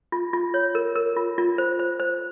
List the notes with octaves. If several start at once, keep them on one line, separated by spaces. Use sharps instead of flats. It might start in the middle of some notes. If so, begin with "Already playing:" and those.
F4
F4
C#5
A#4
A#4
F4
F4
C5
C5
C5